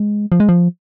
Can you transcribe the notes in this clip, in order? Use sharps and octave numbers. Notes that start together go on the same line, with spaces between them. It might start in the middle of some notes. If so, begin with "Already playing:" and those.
Already playing: G#3
F3
G#3
F3